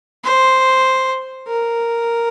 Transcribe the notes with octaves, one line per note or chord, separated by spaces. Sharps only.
C5
A#4